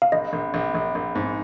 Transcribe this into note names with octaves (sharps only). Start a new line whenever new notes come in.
F5
A#1 D#5
A#1
A#1
A#1
A#1
G#2